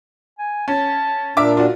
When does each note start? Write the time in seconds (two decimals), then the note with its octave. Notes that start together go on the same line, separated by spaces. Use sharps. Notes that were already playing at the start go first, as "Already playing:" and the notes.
0.39 G#5
0.68 C#4 A5
1.37 A#2 D4 A#4 E5 D6
1.57 F4 F#4